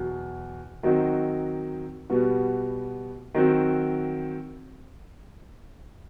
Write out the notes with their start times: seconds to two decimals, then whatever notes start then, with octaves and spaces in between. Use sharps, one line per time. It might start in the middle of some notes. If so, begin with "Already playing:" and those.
Already playing: E2 B2 F#3
0.83 D#3 F#3 C4 D#4 F#4
2.10 B2 G3 B3 F#4
3.35 D#3 F#3 C4 F#4